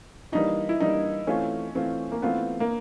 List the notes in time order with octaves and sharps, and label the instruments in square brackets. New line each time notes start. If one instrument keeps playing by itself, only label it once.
[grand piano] E3 G3 A#3 D4 [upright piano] D#4
[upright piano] E4
[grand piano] E3 G3 A#3 D4 [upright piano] D#4
[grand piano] E3 A3 C4 F4 [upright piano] C#4
[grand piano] E3 A3 C4 F4
[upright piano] A#3
[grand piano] E3 A3 C4 F4 [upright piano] B3
[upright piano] A#3